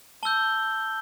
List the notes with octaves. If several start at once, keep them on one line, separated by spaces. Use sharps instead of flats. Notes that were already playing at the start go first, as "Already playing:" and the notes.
A5 E6 G6 G7